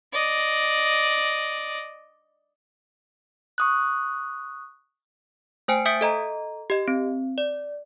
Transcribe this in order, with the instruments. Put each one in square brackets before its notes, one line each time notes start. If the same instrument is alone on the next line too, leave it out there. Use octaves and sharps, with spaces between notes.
[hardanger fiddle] D5 D#5
[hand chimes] C#6 D#6 F#6
[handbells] A3 C5 G5 G#5 D7
E5 D#6 G6 B6 C#7 D7
A4 D#5 A#5
G4 D#5
C4
D5